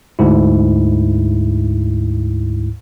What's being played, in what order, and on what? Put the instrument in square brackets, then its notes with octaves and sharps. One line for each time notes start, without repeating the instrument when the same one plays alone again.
[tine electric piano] D2 G#2 E4